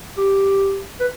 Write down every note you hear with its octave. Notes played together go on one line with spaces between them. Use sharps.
G4
B4